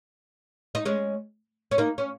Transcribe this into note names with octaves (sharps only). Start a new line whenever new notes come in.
D#4
G#3 C#4
C#4
A#3 D#4
C#4